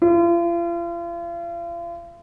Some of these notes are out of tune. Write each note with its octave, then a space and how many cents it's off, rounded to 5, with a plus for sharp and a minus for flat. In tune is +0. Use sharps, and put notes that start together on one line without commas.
F4 -40